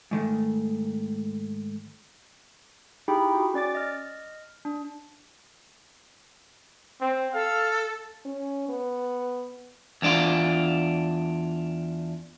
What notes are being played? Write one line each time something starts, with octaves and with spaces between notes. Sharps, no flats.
G#2 D#3 A3
D#4 E4 G4 G#4 G5 B5
F#4
C#4 D5 D6 A6
D#5 F6
D4
C4
A4 F5
C#4
B3
E2 D4 F4